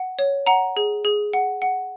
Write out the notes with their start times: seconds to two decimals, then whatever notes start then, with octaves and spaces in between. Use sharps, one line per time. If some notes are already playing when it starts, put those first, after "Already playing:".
Already playing: F#5
0.19 C#5
0.46 F#5 A#5
0.77 G#4
1.05 G#4
1.33 F#5
1.62 F#5